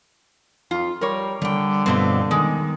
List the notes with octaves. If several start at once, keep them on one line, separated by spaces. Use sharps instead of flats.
F2 F4
G3 A#4 C#5
D3 G3 G5
G2 B2 A3 C4 F4
D#3 G#3